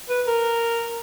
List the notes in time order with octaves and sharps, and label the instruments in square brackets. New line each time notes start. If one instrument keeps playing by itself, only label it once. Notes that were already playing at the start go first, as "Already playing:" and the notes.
[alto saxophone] B4
A#4